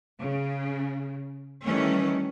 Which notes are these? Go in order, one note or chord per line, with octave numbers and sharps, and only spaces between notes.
C#3
D#3 E3 G3 A3 C#4